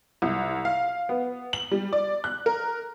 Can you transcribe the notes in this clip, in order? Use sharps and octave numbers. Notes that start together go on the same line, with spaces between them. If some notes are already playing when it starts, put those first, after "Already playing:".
C2
F5
B3
F#7
G3
D5
F#6
A#4